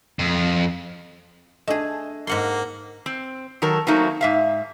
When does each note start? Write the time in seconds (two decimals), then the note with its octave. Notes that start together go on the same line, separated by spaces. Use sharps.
0.19 F2
1.67 A3 D4 G#4 D#5
2.27 G#2 A#3 F#5 C6
3.06 C4
3.62 D#3 F#3 A4 A#4
3.87 F#3 A3 A#3 C4 D#4 F#4
4.21 G#2 E5 F5